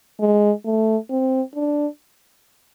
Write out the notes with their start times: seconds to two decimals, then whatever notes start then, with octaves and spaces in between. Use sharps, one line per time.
0.20 G#3
0.65 A3
1.10 C4
1.55 D4